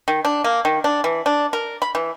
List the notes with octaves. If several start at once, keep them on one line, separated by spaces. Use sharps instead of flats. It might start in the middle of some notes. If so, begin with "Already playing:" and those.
D#3
D4
A#3
D#3
D4
E3
D4
A#4
B5
E3